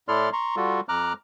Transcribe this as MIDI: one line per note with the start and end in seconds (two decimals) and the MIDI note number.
0.08 0.30 45
0.08 0.30 64
0.08 0.30 69
0.08 0.30 74
0.08 0.30 84
0.08 0.30 89
0.33 0.56 82
0.33 0.56 84
0.33 0.56 85
0.56 0.81 55
0.56 0.81 65
0.56 0.81 66
0.56 0.81 69
0.89 1.13 41
0.89 1.13 82
0.89 1.13 86
0.89 1.13 89
0.89 1.13 90